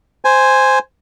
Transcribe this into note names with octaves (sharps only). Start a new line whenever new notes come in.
C5 G#5